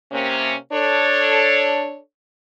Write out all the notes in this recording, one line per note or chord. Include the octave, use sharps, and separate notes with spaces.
C3 A#3 C#4
D4 A4 C#5